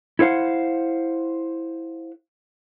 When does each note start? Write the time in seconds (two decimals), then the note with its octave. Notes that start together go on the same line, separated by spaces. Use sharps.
0.19 E4 A4 C5 F5 F#5